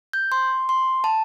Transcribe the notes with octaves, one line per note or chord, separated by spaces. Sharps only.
G6
C6
C6
A5